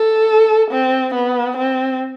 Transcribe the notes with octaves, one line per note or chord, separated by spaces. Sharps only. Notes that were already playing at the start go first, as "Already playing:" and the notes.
Already playing: A4
C4
B3
C4